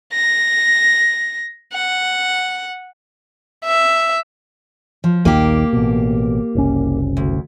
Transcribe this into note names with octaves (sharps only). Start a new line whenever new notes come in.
A#6
F#5
E5
F3
A#1 D#2 D#3 A#3 G4
A1 B2
F#1 C2 C#4
D2